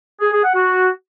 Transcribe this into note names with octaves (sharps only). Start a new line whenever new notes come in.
G#4
G#4
F#5
F#4